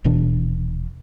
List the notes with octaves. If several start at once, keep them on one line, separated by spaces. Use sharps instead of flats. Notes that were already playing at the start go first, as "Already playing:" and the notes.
D#1 B2 E3 D4